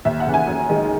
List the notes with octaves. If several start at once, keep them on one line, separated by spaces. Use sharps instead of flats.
D#2 E5
F#5
C#3 E3
G#5
F#2
D#3 G#3 D#4